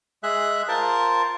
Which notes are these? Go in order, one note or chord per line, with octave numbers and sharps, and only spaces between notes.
G#3 G#4 E5 F#6
F4 A#4 C5 A5